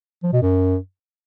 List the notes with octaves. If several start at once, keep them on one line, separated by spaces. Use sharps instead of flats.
F3
B2
F#2